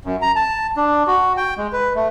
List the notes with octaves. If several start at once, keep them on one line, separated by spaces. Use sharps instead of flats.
F#2
A#5
A5
D4
F#4
G5
G#3
B4
A3